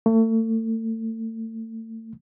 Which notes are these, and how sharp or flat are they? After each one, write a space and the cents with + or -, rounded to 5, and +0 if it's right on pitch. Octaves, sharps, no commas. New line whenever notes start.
A3 +35